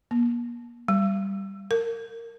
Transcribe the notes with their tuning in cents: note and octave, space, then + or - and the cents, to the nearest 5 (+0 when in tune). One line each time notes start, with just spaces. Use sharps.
A#3 +40
G3 +0
A#4 -20